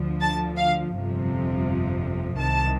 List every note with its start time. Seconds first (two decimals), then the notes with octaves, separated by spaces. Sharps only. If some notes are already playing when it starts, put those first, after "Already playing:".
Already playing: D2 D3 F3
0.21 A5
0.57 F5
0.94 G1 F2 C3 F3
2.38 C2 C3 D#3 A5